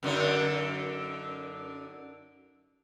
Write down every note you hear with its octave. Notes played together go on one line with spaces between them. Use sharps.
F#2 D3 D#4